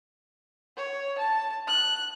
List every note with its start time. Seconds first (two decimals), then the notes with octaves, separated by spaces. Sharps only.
0.77 C#5
1.18 A5
1.68 F#6